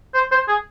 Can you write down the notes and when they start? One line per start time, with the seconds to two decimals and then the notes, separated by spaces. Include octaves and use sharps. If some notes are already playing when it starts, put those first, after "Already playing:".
0.14 C5
0.32 C5
0.48 G#4